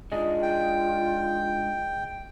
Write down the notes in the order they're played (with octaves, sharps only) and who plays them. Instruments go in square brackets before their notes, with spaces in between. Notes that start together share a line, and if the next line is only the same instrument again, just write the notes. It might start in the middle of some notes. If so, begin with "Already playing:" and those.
[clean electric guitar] G#3 D4 D#4 [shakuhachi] F4 [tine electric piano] G#4 D#5
[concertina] G5